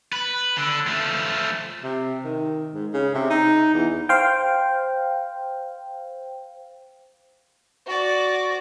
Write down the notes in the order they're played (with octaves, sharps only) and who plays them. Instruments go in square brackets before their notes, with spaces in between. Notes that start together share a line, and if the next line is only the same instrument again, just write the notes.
[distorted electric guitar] B4
D3
F3 A3
[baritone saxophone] C3
D#3
G#2
C#3
C3
D#4
E2
[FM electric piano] C5 F5 G5
[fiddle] F#4 D5